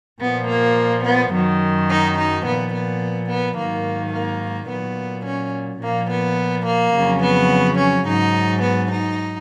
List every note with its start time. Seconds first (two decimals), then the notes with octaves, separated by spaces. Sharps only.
0.21 A#2 F3 B3
0.49 A#3
1.05 B3
1.33 F#2 D#3 F#3
1.90 D#4
2.17 D#4
2.45 A#2 F3 B3
2.74 B3
3.29 B3
3.57 G#2 D#3 F#3 A#3
4.14 A#3
4.69 A#2 F#3 B3
5.25 C#4
5.82 A#2 F3 A#3
6.11 B3
6.66 A#3
6.94 F2 C#3 F#3
7.23 B3
7.79 C#4
8.06 G#2 F#3 D#4
8.62 B3
8.90 D#4